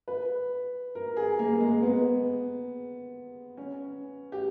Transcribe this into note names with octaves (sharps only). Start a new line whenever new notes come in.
B4
A#4
G#4
A#3
A#3
G#3
B3
C#4
G4